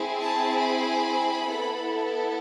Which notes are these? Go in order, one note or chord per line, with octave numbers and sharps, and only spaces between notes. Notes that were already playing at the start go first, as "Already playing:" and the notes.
Already playing: C4 E4 G#4
A5
B5
B3 E4 A4